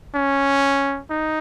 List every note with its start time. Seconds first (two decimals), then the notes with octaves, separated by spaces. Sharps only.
0.15 C#4
1.10 D#4